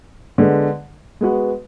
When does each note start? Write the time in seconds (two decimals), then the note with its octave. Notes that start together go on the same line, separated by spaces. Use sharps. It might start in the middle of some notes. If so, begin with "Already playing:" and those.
0.38 D3 G#3 B3
1.21 G#3 B3 F#4 B4